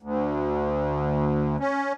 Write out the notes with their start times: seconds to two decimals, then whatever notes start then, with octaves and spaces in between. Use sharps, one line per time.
0.03 D2
1.60 C#4